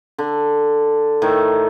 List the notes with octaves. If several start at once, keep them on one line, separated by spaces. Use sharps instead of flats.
D3
A2 D#3